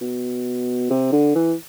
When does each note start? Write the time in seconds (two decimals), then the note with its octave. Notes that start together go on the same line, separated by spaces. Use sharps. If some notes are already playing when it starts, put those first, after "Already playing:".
0.01 B2
0.90 C3
1.12 D3
1.35 E3